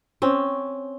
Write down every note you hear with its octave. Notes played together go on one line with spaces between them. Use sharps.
C4 C#4